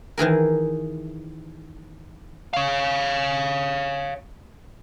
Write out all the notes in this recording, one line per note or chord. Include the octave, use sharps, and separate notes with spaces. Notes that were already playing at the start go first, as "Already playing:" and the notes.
D#3 E3 G#4 A#4
C#5 F5